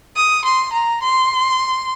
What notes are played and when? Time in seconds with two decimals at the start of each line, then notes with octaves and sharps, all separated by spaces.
0.16 D#6
0.45 C6
0.73 A#5
1.02 C6